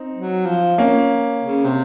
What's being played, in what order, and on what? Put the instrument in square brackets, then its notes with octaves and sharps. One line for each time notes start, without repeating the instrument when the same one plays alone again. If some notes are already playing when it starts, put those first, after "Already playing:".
Already playing: [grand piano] C4 D#4
[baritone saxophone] F#3
F3
[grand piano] A#3 C#4
[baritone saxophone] C#3
C3